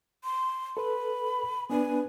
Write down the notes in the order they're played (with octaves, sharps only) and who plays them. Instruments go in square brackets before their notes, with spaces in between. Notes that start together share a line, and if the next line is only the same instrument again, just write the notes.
[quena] C6
[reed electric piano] A4 B4 [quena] B5
[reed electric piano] B3 D4 B4 [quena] G#5